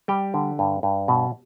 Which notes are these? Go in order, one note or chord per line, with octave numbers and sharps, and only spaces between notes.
G3 G4 G5
D3
G2
G2
B2